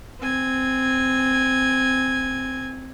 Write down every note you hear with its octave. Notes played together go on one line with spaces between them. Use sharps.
C4 G#5